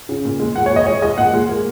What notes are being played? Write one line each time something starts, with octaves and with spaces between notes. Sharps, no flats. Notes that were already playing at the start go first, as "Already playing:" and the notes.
C#3
A#2
G#3
A#2 F#5
C#5
G#3
D#5
G#3 C#5
G#3 D#5
A#2 F#5
G#3
A#3